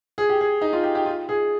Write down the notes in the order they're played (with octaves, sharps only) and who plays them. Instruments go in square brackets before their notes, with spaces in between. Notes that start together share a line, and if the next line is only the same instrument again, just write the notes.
[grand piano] G#4
G4
G#4
D#4
F4
G4
G4
F4
G#4